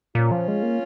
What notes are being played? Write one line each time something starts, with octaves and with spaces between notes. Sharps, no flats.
A#2 C#4 F4
F3
G#3
A#3